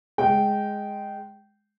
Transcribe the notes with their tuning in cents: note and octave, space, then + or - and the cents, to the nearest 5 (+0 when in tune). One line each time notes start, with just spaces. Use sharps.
G#3 +0 G5 -15